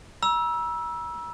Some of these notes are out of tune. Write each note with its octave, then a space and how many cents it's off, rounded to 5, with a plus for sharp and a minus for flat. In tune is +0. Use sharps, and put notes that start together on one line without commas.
A#5 +45 E6 +0